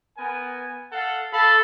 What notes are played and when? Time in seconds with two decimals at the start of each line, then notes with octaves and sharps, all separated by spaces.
0.17 B3 A#4 G#5
0.92 A4 F5 F#5
1.33 A4 F5 B5